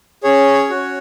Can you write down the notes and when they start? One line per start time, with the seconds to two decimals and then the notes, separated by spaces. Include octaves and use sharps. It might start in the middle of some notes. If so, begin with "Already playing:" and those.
0.23 C#4 G#4 C#5
0.70 C#4 F#4